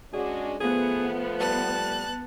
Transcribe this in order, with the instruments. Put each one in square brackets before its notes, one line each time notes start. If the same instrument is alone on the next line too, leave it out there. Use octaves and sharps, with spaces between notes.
[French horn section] G#3 C#4 F#4 [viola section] D4 [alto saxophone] G#4
[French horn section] F3 A3 [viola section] B3 [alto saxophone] G#4
[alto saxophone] G3 [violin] A5 F#6